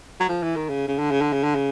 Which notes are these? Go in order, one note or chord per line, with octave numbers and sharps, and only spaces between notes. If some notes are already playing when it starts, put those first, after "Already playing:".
F#3
F3
E3
D#3
C#3
C#3
D3
C#3
D3
C#3
D3
C#3